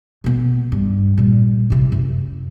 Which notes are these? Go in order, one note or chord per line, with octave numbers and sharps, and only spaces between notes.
B2 B3
G2
A#2 G3
C3 E4
F#2